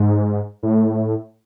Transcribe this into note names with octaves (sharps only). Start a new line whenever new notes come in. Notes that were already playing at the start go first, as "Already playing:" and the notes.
Already playing: G#2
A2